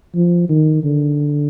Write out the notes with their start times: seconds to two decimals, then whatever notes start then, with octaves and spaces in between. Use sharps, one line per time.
0.15 F3
0.49 D#3
0.84 D3